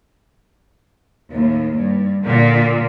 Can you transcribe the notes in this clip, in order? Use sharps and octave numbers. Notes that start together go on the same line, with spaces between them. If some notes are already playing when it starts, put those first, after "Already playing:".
D#2 A2
G2
A#2 D3